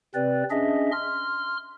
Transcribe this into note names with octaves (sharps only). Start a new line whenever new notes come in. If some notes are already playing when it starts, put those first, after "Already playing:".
C3 C4 B4 D5
C#4 D4 G#4 D#5 E5
C6 F6